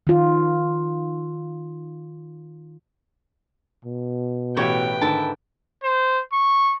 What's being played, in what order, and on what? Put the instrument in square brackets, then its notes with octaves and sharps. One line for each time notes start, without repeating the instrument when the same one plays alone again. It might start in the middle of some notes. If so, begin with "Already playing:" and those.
[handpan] D#3 F4
[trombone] B2
[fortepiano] A1 G4 [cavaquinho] E4 F#4 C#5 [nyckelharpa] B4 G5
[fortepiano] G#2 D3 D#3 [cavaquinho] E4 A5
[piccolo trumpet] C5
C#6